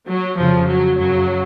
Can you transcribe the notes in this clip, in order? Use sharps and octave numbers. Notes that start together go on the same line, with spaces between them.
F#3
F2 C#3 F3
F#3
F#2 C#3 F#3